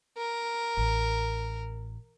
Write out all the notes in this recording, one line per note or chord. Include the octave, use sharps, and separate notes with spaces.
A#4
A1